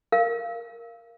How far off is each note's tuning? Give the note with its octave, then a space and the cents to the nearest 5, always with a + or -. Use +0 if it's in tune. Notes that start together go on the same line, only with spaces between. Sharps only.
A#4 +0 F5 -20